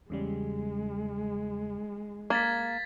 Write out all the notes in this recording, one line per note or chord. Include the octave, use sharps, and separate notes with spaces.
E2 C#3 G3 G#3
A#3 G#6 A6 B6